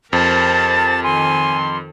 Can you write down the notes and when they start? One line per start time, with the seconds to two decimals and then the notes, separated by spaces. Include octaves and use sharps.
0.13 F2 G4 A#4 C5 A5 A6
1.03 D#3 A4 G#5 C6